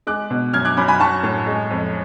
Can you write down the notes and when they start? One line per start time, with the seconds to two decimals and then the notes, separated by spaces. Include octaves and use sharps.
0.07 G#3 D6 F#6
0.30 B2
0.53 F#2 F6 G#6
0.65 D6 F#6
0.77 F#2 B5 D6
0.88 G#5 B5
1.00 F#3 A5 C#6
1.23 A2
1.47 G#3
1.70 F2